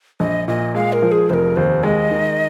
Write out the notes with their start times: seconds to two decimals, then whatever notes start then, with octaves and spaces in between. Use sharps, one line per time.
0.20 A#1 D#5
0.48 A#2 D#5
0.75 G#3 F5
0.93 A#4
1.02 F3
1.12 G#4
1.30 F1 A#4 C5
1.56 D#2 C5
1.83 G#3 D#5
2.11 D#3